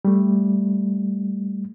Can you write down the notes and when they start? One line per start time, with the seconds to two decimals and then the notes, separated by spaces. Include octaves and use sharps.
0.05 G3 A3